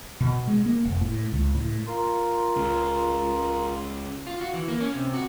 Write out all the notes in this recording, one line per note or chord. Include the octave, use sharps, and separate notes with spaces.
B2
G#3
A#3
F1
A2
C#2
A2
F4 A#4 C6
C#2 C#3
F4
F#4
E3
A#3
C#4
C3
F#4